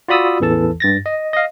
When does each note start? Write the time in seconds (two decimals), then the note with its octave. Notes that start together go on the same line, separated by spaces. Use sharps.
0.08 F4 F#4 D5 B5 D#6 E6
0.40 A1 E2 E3 A4 A5
0.80 G2 A6 A#6
1.06 D#5
1.33 D#5 F5